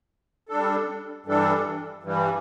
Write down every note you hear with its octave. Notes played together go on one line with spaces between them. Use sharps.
G3 D4 A4
G2 E3 G3 D4 A4
G2 E3 G3